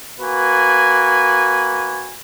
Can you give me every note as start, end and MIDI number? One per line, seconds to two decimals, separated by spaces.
0.20 2.14 58
0.20 2.14 66
0.20 2.14 71
0.20 2.14 80